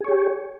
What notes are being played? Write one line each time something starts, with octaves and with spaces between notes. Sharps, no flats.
G4 G#4 C#5